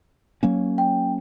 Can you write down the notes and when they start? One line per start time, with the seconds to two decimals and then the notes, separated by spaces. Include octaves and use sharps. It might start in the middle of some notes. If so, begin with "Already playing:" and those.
0.43 F#3 A#3 C#4
0.78 G5